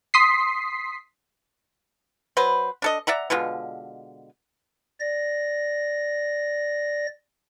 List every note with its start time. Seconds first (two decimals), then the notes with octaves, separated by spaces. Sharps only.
0.14 C6 D#6 B6 C7
2.37 F#3 B4 C5
2.82 D4 A4 D#5
3.07 D5 E5 F#5 A#5
3.30 B2 D3 G#3 F4
5.00 D5 A#6